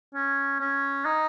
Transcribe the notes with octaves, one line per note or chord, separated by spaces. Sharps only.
C#4
C#4
D#4